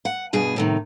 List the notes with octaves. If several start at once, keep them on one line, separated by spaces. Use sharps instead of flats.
F#5
G2 B2 G#4
A2 C3 D#3